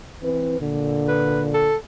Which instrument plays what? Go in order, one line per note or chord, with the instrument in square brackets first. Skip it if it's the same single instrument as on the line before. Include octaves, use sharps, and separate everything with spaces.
[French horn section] E3 C4 B4
A#2 D3
[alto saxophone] B4
A4